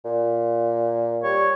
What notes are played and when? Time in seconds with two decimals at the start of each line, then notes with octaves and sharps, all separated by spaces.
0.05 A#2
1.23 G3 C#5